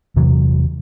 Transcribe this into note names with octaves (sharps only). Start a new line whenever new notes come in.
E2 C3 E3 F#3